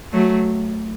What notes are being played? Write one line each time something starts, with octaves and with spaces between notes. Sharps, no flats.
F#3 A3